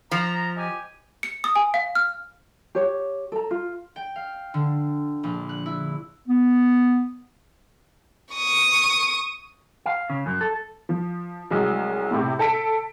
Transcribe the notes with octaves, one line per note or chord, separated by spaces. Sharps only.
F3 A#5
G4 D#5 G#5
C#7
D#6
G#5
F5
F6
G4 C#5
A4 A#5
F4
G5
F5
D3
A#1
F#6
E4
B3
C#6 D#6
F5
C#3
F#2
A4
F3
C2 F#3 G#3
A2 C3
A4 A5 B6 D7